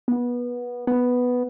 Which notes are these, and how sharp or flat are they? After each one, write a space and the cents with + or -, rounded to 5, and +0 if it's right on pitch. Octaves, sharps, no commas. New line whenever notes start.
B3 -20
B3 +0